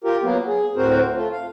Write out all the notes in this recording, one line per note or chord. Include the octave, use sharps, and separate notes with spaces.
F4 G4 A#4
F#3 A#3 B3
G#4
D2 A2 C4 F#4 A#4 C5
A3 F4
F5